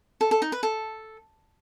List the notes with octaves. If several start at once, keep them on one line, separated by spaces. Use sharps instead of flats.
A4
A4
D#4
B4
A4